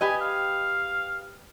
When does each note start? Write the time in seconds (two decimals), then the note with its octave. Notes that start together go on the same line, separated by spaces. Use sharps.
0.01 G4 B4 D#5 G#5
0.22 F5